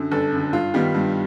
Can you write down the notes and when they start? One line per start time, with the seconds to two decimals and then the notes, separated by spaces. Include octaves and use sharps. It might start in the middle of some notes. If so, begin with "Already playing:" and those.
Already playing: F#2 D3
0.11 G1 A4
0.32 F#2 D3
0.53 G2 F4
0.74 D#3 G3 B3
0.95 G2